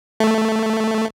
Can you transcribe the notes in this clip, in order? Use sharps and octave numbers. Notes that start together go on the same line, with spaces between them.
A3